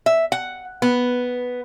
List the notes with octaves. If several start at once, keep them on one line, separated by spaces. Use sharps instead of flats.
E5
F#5
B3